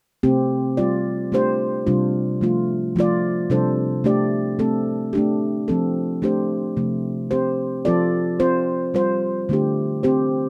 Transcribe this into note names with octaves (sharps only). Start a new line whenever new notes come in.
C3 A3 C4 G4
G3 F4 D5
A3 D4 G4 C5
C3 G3 D4 F4
F3 A3 F4
F3 A3 F4 D5
C3 G3 D4 A4 C5
A3 D4 G4 D5
A3 C4 A4
A3 D4 G4
F3 C4 A4
A3 D4 G4 C5
C3 F3 A3
C4 G4 C5
F3 C4 F4 A4 D5
C4 F4 C5
G3 F4 C5
D3 A3 D4 G4
C4 G4 C5